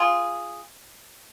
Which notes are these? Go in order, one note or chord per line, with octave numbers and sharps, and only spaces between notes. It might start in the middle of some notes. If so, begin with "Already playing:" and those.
Already playing: F4 G#4